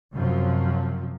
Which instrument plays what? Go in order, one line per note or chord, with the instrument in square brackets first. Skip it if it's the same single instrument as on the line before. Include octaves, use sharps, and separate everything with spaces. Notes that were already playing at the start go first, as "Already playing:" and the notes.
[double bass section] F#2 C3 F3 F#3